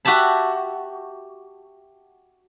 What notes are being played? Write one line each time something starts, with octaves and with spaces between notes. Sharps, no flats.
F#4 G4 E5 A5 B5